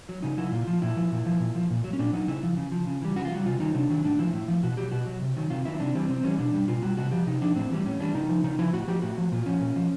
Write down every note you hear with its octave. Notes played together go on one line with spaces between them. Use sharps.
F#3
C#3 D#4
F#3 E4
A#2 F4
F3
A#2 E4
F3
A#2
F3
A#2
F3
A#2
F#3
C#4
A#2 D4
F#3 D#4
C#3 E4
F3
C#3
F3
C#3
E3 G3
C#3 F#4
F4
E3
G3 F#4
C3 F4
D#3 F#3 D#4
C3 D4
D#3 F#3
A2 D4
F3 E4
A2
F3
B2 F#4
F#3 G4
B2 F#4
F#3
C3
D#3 F#3
C3 F4
D#3 F#3 E4
C3 D4
E3 G3 C4
C3 C4
E3 G3 C#4
B2 D4
G3
B2 F4
G3 F#4
C3 F#4
F3 G4
C3 D#4
F3 D4
A2 C4
E3 G3
A2 C#4
E3 G3 D4
C#3 D#4
F3
C#3 D#4
F3 E4
A2 F#4
F3 G4
A2 F#4
F3
A#2 F4
F3 C#4
A#2
F3